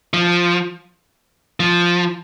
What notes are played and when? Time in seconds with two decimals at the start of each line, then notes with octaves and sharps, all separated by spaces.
0.13 F3
1.60 F3